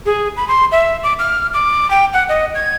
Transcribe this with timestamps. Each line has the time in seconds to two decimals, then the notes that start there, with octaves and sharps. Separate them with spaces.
0.06 G#4
0.37 B5
0.48 C6
0.72 E5
1.04 D6
1.19 F6
1.54 D6
1.90 G5
2.13 F#5
2.29 D#5
2.55 G#6